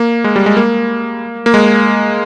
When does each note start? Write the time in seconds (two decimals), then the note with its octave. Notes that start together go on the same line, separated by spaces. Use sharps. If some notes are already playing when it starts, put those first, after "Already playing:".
Already playing: A#3
0.24 G#3
0.36 G3
0.46 G#3
0.57 A#3
1.46 A#3
1.54 G#3